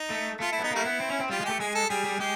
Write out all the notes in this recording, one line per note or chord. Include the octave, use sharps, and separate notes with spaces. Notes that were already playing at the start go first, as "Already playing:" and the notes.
Already playing: D#4
A3
A3 F4
E4
B3
D#4
G3 A3 A#3 E4
B3
C4
C#4
C4
G3 F4
G#3
A3 G4
G#3 G#4
A4
G3 G#4
G3
G#3 G4